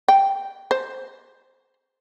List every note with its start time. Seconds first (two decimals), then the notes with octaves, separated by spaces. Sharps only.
0.08 G5
0.71 C5